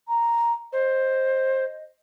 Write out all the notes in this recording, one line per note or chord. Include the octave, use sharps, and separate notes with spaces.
A#5
C5 D#5